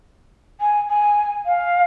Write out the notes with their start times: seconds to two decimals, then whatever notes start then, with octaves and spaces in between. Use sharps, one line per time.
0.60 G#5
0.88 G#5
1.46 F5